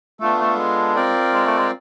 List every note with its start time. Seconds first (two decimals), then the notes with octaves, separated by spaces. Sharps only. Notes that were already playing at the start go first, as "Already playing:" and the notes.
0.20 A3 B3 D4 F4 A4
0.39 A3
0.58 G#3
0.95 C4 F4 A#4 D5 G5
1.34 G#3
1.46 A3
1.58 G#3